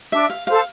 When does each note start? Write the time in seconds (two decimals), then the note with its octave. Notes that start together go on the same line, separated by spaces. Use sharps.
0.12 D4 E5
0.30 F5
0.47 A4 C5 F5